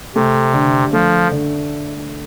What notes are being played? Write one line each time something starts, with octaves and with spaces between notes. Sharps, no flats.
C3 A3
D3
F3 A3
D3